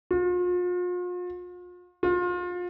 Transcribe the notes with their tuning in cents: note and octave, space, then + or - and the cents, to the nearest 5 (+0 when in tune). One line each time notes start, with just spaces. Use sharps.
F4 +40
F4 +30